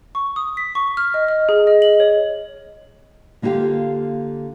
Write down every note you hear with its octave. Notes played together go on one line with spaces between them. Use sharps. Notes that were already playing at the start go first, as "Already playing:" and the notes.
C#6
D#6
B6
C#6
F6
D#5
F6
G#4
D#5
F#7
C#5
D3 A#3 E4 F4 G4 F5